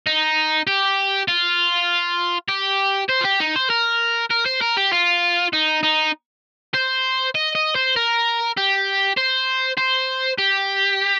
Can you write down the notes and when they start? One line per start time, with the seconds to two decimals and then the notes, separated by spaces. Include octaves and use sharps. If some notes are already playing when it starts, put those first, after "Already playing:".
0.07 D#4
0.67 G4
1.28 F4
2.49 G4
3.10 C5
3.21 F4
3.25 G4
3.40 D#4
3.56 C5
3.70 A#4
4.31 A#4
4.46 C5
4.62 A#4
4.77 G4
4.93 F4
5.53 D#4
5.83 D#4
6.74 C5
7.35 D#5
7.55 D#5
7.75 C5
7.96 A#4
8.57 G4
9.17 C5
9.77 C5
10.38 G4